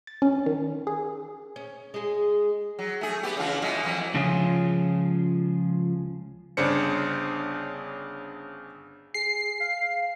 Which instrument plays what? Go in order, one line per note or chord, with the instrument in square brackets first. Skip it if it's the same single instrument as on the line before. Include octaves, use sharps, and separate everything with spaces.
[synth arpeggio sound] A6
C#4
D#3
G#4
[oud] C#4
G#3 G#4
[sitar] F#3
A3 G#4
B3 G4
C#3 E3 F4
B2 G#3
F2 E3 F#3
[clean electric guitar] C#2 C#3 F3 C#4 F4 G#4
[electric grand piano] G1 C#3 D4 C5 C#7
[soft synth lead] G#4 [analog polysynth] C7
[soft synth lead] F5